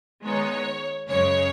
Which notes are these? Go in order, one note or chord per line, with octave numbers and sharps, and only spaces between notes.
D#3 G#3 B3 D#4 C#5
F#2 C#3 G#3 C#5